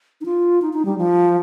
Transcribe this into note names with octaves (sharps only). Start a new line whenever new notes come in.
D#4
F4
D#4
D#4
G3
F3